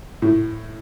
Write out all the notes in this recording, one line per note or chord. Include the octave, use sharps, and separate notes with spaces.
A2